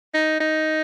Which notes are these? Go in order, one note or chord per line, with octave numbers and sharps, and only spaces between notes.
D#4
D#4